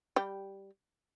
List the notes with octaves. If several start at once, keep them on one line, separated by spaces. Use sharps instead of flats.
G3 G4